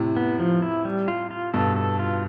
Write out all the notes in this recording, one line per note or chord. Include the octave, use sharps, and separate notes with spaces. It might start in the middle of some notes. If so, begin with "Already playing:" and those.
Already playing: A2 C3
B3
F3
E4
G3
F4
F4
G2 B2 A4
A4
F4